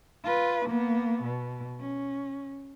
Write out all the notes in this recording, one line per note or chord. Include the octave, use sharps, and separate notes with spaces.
F4 B4
A#3 B3
B2
C#4